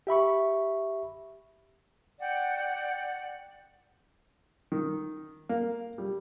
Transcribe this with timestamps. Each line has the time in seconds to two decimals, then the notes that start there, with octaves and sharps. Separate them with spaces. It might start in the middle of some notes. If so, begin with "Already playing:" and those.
0.07 G4 E5 B5 C#6
2.19 D5 F#5 G5
4.72 D#3
5.49 A#3
5.98 G3